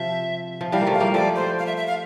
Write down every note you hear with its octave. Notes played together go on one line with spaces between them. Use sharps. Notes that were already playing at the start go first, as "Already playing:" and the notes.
Already playing: C3 F3 E5
F3
E3 G3 F5
A#3
F3 A3
F5
G3 A#3
F3 A3 D5
C5
F5
E5
E5
F5